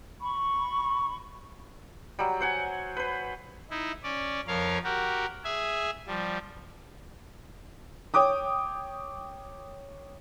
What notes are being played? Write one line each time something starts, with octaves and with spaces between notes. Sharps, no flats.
B5 C#6
F#3 G3
C5 F#5 G#5
B4 C5
D#4 E4
C#4 D5
F2 F3 A#4 C#5 F5
F#4 G4 A#4
G#4 E5 G#5
F3 G3
C#5 G5 D6 D#6